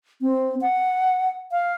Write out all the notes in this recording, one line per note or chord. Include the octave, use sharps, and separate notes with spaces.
C4
F#5
F5